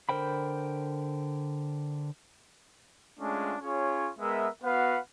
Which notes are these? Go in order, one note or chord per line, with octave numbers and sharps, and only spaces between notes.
D3 A#4 C5 G5 B5
G#3 A3 C#4 D4 F4
C#4 F4 G#4 C#5
G#3 B3 A#4 E5
B3 F#4 B4 F5 F#5